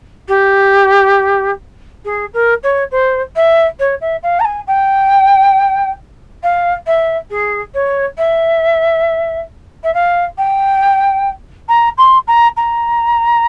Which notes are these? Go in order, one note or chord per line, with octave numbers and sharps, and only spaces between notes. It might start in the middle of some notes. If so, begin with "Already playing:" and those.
G4
G#4
A#4
C#5
C5
E5
C#5
E5
F5
A#5
G#5
G5
F5
E5
G#4
C#5
E5
E5
F5
G5
A#5
C6
A#5
A#5